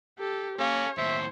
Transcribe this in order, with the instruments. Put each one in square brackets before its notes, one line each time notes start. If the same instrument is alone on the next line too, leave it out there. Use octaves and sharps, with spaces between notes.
[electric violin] G4 A4
[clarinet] A#3 [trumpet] C#4 [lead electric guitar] A4 F5 [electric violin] C#5
[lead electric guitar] D#2 A2 [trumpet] C5 [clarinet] E5